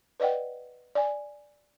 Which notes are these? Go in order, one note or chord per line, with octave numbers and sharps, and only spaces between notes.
B4 D5 D#5 F#5 G5
D5 G#5